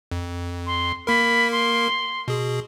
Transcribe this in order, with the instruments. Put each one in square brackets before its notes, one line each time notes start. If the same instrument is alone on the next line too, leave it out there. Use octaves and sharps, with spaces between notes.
[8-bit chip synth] F2
[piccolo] C6
[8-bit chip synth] A#3 A#4 [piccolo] B5
[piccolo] C6
[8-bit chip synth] B2 G#4